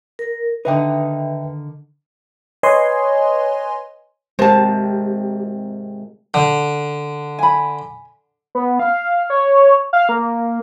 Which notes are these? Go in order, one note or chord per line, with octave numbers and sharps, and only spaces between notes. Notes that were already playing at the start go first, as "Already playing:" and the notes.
A#4
D3 D#3 D#4 B4 E5 G5
B4 C#5 D#5 G#5 C6
G#1 C3 G#3 G4 A#4 C5 A5
D3
G#5 B5
B3
F5
C#5
F5
A#3